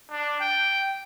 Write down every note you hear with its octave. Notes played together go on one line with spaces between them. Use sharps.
D4
G5